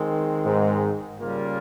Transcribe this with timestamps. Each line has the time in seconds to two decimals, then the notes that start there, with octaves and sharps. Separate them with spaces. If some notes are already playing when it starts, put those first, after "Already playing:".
Already playing: D#3 G#3 C4
0.45 G#2
1.19 C#3 G3 A#3 F4 A#4